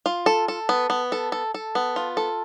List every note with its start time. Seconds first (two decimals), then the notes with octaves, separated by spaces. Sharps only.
0.06 F4
0.26 A4
0.48 A4
0.69 B3
0.90 B3
1.12 A4
1.32 A4
1.54 A4
1.75 B3
1.96 F4
2.17 A4